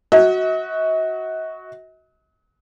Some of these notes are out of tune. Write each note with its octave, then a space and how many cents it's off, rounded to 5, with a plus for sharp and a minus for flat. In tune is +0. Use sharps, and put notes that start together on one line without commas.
F#4 +0 D#5 +45